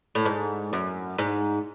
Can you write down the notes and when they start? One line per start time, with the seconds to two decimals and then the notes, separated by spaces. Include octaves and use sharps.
0.15 A2
0.25 G#2
0.73 F#2
1.18 G#2